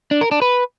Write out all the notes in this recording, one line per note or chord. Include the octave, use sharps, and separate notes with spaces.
D4
A#4
D4
B4